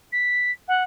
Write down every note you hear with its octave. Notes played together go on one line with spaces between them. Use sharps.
B6
F#5